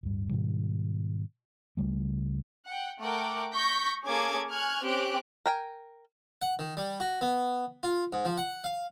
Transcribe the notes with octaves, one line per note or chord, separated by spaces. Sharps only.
D1 G2
G#2 B2 D#3 G3
C#2 C#3 G3 A3
F#5 G5
A3 A#4 F#5 G5 D6
C#6 G6 A#6 B6
A#3 C#4 G#4 A4 D6 G#6
G#5 C#6 F6 F#6 G#6
C4 C#4 G4 G5 F#6 D7
A#4 G5 G#5
F#5
D#3
G3
F#4
B3
F4
G#2
F3
F#5
F5